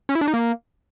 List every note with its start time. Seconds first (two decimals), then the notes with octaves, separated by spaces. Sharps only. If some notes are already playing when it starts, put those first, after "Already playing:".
0.09 C#4
0.15 E4
0.21 D4
0.28 D#4
0.34 A#3